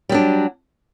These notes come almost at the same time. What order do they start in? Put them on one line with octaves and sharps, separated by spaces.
G3 F#3 D4